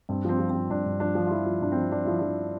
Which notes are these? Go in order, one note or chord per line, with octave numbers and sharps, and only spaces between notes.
G2 C4
F3 C4
F3
C4
F3
G2 D4
G2
F3 D4
F3
F4
F3 E4
F3
G2 D4
F3 C4
F3 D4
F3 E4
F3 D4